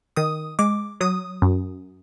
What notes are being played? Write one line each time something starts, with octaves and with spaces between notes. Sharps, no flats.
D#3 D#6
G#3 D6
F#3 D#6
F#2